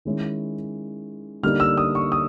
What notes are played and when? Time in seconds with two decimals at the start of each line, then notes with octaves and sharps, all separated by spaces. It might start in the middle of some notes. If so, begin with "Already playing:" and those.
0.05 D#3 G#3 C#4 E4
1.43 D3 G3 A#3 D#4 F6
1.60 E6
1.78 D#6
1.95 C#6
2.12 D#6